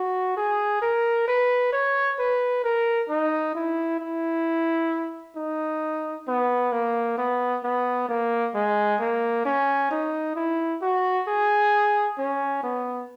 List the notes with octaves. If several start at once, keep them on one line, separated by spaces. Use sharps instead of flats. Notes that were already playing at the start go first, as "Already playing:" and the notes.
Already playing: F#4
G#4
A#4
B4
C#5
B4
A#4
D#4
E4
E4
D#4
B3
A#3
B3
B3
A#3
G#3
A#3
C#4
D#4
E4
F#4
G#4
C#4
B3